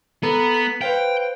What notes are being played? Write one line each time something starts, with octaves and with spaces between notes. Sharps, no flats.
B3 A4 A#5 B5
B6
B4 C5 F5 G5